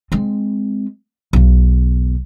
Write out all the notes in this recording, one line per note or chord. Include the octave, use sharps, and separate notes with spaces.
G#3 C4
B1 E2